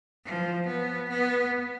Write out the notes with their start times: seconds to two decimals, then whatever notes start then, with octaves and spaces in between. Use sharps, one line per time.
0.25 F3
0.67 B3
1.09 B3